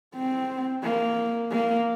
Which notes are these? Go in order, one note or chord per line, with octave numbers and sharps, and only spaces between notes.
C4
A#3
A#3